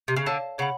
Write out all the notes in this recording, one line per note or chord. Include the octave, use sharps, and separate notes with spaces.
C3
C#3
D3 C#5 F5 A5
C#3 C#5 F#5 B5